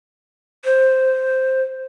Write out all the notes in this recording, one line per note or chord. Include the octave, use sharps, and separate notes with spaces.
C5